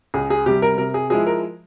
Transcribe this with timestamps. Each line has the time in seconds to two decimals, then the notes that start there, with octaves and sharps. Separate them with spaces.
0.14 C#2 G#4
0.30 G#4
0.46 C3 G3 G4
0.62 A#4
0.78 C3 A#4
0.94 G#4
1.10 F3 G#3 E4 G#4
1.26 A#4